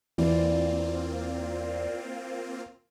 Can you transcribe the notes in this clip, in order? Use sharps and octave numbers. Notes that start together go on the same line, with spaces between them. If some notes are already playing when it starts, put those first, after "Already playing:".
E2 E3 A#3 C4 F4 D5